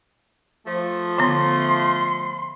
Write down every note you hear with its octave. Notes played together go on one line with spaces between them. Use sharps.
F3 A3
D3 B3 C6